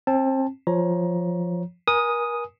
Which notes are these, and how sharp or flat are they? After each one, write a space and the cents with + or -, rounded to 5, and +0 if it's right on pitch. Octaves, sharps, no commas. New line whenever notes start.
C4 +30 A5 +0
F3 +0 C#5 +0 A#5 +20
A#4 +35 G#5 +0 D#6 +0